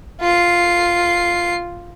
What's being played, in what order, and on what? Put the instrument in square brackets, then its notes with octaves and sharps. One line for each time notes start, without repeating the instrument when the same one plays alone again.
[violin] F4 C7